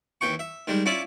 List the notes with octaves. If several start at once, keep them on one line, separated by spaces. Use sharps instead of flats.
D#2 E3 G5 C#6
E5
D#3 G3 G#3
C#4 E4 F4 D5 E5